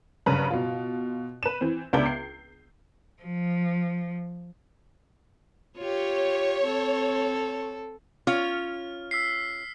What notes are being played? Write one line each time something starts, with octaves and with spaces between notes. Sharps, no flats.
F#1 G2 C#3 B4 A#5
B2 F4
B4 E7
E3 C4
C#2 B3 D4 E5 D6 G6
C7
F3
F4 G4 C#5
C4 A4
C#4 F4 C#5 F6
E6 B6 C7